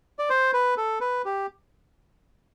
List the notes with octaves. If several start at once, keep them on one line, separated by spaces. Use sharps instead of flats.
D5
C5
B4
A4
B4
G4